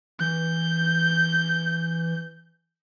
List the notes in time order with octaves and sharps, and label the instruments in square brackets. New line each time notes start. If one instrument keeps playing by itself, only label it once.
[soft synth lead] E3 [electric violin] G6